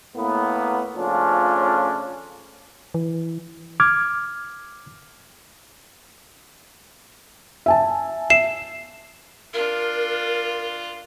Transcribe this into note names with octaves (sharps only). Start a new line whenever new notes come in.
A2 A#3 B3
C#3 F3 A3 C#4 D4 F4
E3
D6 F6 G#6
E5 G#5 A5
E5 C7 E7
D4 F4 A#4